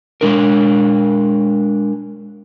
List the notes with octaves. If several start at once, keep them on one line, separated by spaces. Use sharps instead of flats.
G#3 D4 A#4